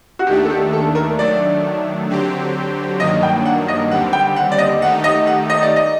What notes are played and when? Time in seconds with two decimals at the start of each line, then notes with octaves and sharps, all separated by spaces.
0.19 F#4
0.27 D#2 D#3 A3 D4 G4
0.45 A4
0.50 G4
0.73 A4
0.95 A#4
1.18 D#3 F#3 A3 D4 D5
2.09 D3 F#3 C4 G4
3.00 G2 D#3 F#3 A#3 D4 D#5
3.23 G5
3.46 F#5
3.68 D#5
3.91 D#2 D3 G3 C4 G4 F#5
4.13 G5
4.36 F#5
4.52 D5
4.58 D#5
4.82 D#3 A3 D#4 G4 F#5
5.04 D#5
5.27 F#5
5.50 D#5
5.63 D5
5.76 D#5